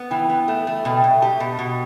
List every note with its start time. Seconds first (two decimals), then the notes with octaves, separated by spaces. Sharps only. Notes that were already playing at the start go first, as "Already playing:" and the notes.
Already playing: B3
0.11 E3 G5
0.30 B3
0.48 A3
0.67 A3
0.85 B2 G5
0.97 G5
1.04 B2
1.09 E5
1.22 G4 A5
1.40 B2
1.59 B2